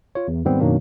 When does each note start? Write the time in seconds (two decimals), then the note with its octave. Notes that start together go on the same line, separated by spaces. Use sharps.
0.15 F4 C#5
0.28 E2
0.45 G#2 D#3 G3 B3 C4
0.60 F#2 B2 D#3 F#3 A#3 D4